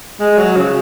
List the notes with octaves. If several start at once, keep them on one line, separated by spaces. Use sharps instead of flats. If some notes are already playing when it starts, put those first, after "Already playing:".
G#3
F#3
C#3